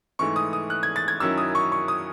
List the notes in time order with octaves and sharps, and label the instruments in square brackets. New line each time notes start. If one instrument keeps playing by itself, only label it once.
[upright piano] G#2 E3 A3 C#6
D#6
D#6
F#6
G#6
A6
G#6
F#2 D#3 F#3 C#4 E4 E6
D#6
C#6
C#6
D#6